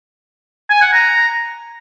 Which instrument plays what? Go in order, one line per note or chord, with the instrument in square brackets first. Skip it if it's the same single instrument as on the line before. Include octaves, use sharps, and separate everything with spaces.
[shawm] G#5
F#5
A#5